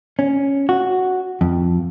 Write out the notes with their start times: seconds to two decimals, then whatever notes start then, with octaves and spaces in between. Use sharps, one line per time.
0.19 C#4
0.69 F#4
1.41 F2